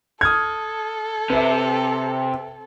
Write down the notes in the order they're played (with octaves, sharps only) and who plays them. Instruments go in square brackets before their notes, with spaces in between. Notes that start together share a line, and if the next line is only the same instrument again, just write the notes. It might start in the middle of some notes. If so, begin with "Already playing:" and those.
[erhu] A4 [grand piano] D#6 F6 [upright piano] G#6
[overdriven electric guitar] C3 [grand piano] B4 E5